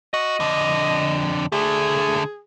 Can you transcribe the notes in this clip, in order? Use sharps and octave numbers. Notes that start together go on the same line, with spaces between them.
F#4 D#5
F2 D3
D3 A3 G#4